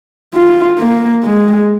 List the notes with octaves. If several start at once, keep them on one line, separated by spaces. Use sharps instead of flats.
F4
A#3
G#3